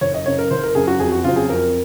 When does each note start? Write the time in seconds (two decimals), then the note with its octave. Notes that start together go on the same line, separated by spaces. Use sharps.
0.01 F#1 C#5
0.14 D#5
0.26 F#2 C#3 C#5
0.38 A#4
0.51 F#1 C5
0.63 A#4
0.75 F#2 C#3 G#4
0.87 F#4
1.00 F2 G#4
1.12 F#4
1.24 C#3 F#3 C4 F4
1.36 G#4
1.50 F2 A#4